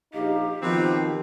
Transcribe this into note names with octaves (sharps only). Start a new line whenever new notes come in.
A#1 D#4 G4 F5
B2 D#3 F3 C4